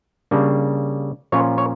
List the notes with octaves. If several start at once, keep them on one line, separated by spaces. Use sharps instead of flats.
C#3 G3 A#3 D4
A#2 F3 C#4 F4 C#5
C#5